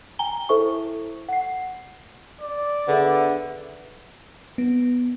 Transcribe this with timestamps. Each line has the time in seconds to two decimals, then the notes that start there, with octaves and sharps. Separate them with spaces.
0.19 G5 G#5 A#5 G7
0.49 E4 A4 C5 E5 C#6
1.29 F#5 C7
2.41 D5
2.88 D3 B3 G#4 E5
4.58 B3